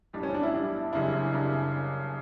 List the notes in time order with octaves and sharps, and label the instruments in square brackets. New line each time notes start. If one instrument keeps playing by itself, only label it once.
[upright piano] B1 A2 G3 D4
[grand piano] C#4
D4
E4
[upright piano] B1 A2 G3 D4
[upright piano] F#1 F#2 C#3 G3 D4 [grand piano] E4
[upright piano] C#3 G3 D4